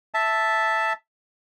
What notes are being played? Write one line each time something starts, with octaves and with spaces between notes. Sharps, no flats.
E5 A5